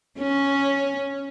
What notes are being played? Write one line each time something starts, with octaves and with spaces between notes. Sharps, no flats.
C#4